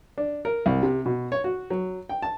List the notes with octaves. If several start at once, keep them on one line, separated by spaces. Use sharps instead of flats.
D4
A#4
C2
C3
B2
C#5
F#4
F#3
G5
A5